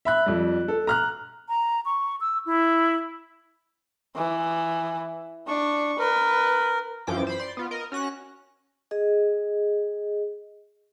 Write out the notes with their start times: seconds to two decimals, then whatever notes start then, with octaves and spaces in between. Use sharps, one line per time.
0.05 E5 B5 F#6
0.26 F2 G3
0.68 A4
0.87 A#5 F6 F#6
1.49 A#5
1.85 C#6
2.21 E6
2.46 E4
4.16 E3
5.48 D4 C#6
5.99 A#4 B4
7.07 F#2 E3 F3 G5 D6
7.27 C5 B5
7.39 D5 C6
7.57 B3 F4
7.71 A#4 D#5
7.92 C#4 F#4 F#6 A#6
8.91 G#4 D#5